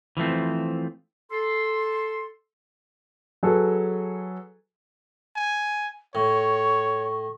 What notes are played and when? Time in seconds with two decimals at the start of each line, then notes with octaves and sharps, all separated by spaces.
0.17 E3 F3 A3 C4
1.31 A4 C6
3.43 F#3 F#4 G#4 A4 B4
5.36 G#5
6.15 A2 C#5 C#6